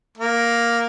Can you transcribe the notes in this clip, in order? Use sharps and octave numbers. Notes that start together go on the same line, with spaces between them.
A#3